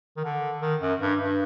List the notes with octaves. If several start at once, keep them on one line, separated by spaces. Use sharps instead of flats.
D#3
D3
D#3
F#2
G2
G2